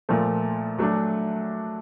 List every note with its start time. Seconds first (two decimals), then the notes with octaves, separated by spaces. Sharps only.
0.09 A#2 F3 A3
0.78 F#3 A3 D4